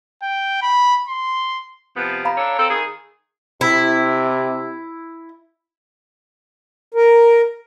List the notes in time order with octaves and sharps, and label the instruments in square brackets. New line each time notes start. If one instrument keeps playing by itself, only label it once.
[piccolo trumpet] G5
B5
C6
[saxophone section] C3 F3 B3
[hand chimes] F5 A#5 B5
[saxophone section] D4 A4 C#5
C4 A4
D#3 G#4
[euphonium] C3 [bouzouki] E4
[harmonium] A#4